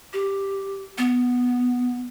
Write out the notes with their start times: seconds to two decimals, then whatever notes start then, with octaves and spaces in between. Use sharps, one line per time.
0.13 G4
0.98 B3